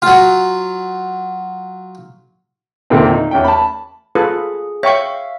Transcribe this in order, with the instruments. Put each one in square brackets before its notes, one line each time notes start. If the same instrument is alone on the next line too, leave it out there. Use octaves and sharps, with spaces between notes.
[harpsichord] F#3 F4
[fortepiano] E2 A#2 D3 D#3 A#3 C4
D#4
E2 C#4 G5
A5 B5
[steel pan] F4 A4 B4 [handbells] G#4
[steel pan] C#5 G5 C#6 [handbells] E5 F5